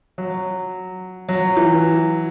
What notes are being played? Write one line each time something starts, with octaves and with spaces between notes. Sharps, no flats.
F#3
F#3
E3